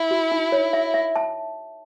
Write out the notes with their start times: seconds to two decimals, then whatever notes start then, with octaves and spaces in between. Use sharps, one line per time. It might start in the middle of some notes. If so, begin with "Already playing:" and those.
Already playing: E4
0.11 F#4
0.32 D#4
0.52 C#5
0.73 E5
0.94 E5
1.16 A5